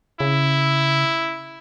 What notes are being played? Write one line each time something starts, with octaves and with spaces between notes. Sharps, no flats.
C#3 E4